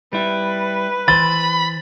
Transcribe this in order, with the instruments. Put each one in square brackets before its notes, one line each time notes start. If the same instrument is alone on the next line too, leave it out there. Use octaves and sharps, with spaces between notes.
[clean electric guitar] G3 E4 [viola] B4
[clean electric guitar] E3 C5 [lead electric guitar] B5 [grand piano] A6